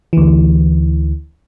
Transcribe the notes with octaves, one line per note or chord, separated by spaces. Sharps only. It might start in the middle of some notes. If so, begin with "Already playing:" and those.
D2 E3